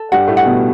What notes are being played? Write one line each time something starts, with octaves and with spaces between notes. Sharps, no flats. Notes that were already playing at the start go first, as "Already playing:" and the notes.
Already playing: A4
G2 G3 F#5
A2 A3
F#5
B2 B3